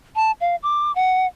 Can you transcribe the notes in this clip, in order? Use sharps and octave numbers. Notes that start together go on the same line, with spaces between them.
A5
F5
D6
F#5